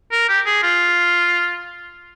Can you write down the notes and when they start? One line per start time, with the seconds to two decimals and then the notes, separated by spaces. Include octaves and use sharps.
0.12 A#4
0.29 G4
0.46 G#4
0.63 F4